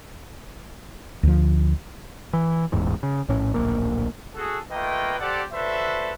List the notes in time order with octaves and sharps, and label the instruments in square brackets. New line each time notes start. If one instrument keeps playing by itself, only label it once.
[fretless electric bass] D2 F3
[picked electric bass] E3
E1 A1 E2 G#2
C#3
A#1 A2 C#4
D1 A#1 A#3
[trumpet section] F#4 G#4 A4
A3 A#3 F4 B4 D#5 G5
G4 A4 C5 D5 F#5
F#4 A4 B4 C5 D5 E5